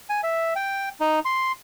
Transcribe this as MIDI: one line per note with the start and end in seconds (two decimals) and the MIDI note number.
0.10 0.21 80
0.23 0.54 76
0.56 0.89 79
1.01 1.19 63
1.25 1.52 84